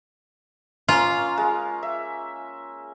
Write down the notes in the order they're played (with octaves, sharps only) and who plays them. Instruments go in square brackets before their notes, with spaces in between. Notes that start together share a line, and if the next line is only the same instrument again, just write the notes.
[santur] A#3 C#4 [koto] F4
[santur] G#3 F5
E5